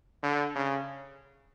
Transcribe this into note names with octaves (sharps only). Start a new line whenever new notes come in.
D3
C#3